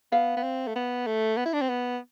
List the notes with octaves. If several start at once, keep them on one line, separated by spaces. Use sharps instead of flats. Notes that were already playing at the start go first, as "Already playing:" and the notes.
B3 F5
B3
C4
A3
B3
A3
B3
E4
D4
C4
B3